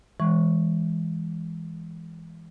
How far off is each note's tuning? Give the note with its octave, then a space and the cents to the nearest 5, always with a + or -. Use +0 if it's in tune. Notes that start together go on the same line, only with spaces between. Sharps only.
E3 +0 G#3 -10 C#6 +0